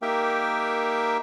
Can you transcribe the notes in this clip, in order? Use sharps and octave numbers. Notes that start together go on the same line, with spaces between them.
A#3 D#4 G4 A#4 E5 G5